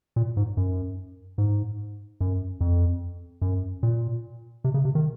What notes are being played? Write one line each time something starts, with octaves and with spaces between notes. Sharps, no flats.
A#2
G#2
F#2
G#2
F#2
F2
F#2
A#2
C3
C#3
C3
D#3